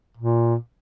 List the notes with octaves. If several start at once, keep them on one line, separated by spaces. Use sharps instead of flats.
A#2